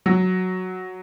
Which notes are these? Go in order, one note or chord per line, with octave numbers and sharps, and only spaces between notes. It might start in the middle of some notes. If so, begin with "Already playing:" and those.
F#3